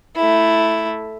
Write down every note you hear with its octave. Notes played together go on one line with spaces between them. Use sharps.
A3 E4